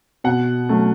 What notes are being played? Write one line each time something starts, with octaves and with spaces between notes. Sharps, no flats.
B2 F#5
F#3 A3 C#4